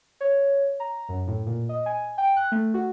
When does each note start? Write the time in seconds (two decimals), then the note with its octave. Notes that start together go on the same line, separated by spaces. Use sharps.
0.21 C#5
0.80 A#5
1.09 F#2
1.27 A2
1.46 A#2
1.69 D#5
1.86 G#5
2.18 G5
2.36 F#6
2.52 A3
2.74 F#4